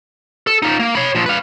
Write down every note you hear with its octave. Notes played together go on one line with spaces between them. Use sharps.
A4
D#4 F4
A#3
C#5 B5
A#2 F3
B4 F5